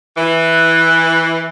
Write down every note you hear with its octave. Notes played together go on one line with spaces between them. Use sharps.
E3